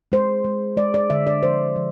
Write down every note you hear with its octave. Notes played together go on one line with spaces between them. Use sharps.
G#3 C5
G#3
G#3 D5
D5
D3 E5
D5
F3 C5
F3